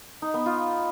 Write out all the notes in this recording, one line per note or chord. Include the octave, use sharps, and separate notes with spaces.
D#4
B3
F4